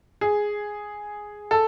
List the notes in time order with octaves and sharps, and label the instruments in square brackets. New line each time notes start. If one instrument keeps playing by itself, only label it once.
[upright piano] G#4
A4